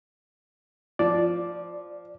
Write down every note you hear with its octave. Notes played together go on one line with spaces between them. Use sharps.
F3 D5